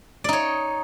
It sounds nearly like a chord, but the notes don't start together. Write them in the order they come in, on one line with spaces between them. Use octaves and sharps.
D5 D#4 C#5